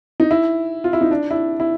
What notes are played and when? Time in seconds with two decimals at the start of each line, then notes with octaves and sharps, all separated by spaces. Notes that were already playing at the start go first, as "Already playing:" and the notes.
0.20 D#4
0.31 E4
0.84 F4
0.93 E4
1.01 D#4
1.11 D4
1.31 E4
1.60 E4